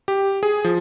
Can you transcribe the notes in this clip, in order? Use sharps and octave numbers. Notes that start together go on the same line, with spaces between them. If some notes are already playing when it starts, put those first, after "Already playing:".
G4
G#4
F3